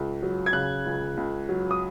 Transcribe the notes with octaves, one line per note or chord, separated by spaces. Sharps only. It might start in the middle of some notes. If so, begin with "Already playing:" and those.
Already playing: C#2
F#3
G#6
C#3 F#6
C#2
C#2
F#3
D#6